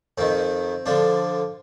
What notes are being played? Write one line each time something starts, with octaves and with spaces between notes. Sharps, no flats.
F2 D#3 C4
D3 F3 D4